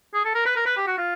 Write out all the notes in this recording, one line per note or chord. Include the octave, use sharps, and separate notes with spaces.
G#4
A4
A#4
B4
A#4
B4
G4
F#4
F4